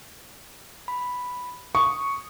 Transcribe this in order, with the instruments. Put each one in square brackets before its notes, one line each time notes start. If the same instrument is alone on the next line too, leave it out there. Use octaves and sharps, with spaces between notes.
[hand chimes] B5
[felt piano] C#6 [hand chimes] D#6